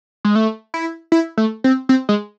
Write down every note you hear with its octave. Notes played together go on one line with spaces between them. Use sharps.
G#3
A3
E4
E4
A3
C4
C4
G#3